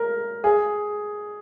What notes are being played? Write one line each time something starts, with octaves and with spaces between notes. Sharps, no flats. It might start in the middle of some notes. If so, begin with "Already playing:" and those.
Already playing: A#4
G#4